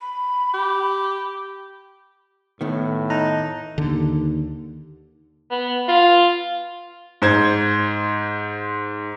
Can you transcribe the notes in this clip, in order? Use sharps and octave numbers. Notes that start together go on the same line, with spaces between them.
B5
G4
A2 D#3 B3
D#4 A5 A#5 F#6
D#2 D3
B3
F4
G#2 C5 G#6